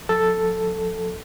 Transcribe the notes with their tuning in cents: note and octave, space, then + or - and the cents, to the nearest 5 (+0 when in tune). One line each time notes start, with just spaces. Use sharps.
F3 +45 A4 +0